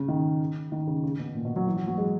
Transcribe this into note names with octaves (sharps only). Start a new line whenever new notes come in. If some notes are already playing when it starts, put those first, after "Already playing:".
Already playing: C#3
D#3
D#3
C#3
C#3
B2
A#2
B2
F#3
E3
F#3
F#3
G#3